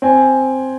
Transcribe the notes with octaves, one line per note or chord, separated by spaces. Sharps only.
C4 G#5